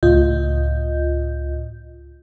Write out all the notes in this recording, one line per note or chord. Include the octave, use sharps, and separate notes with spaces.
C#2 A2 F4 D#5 G6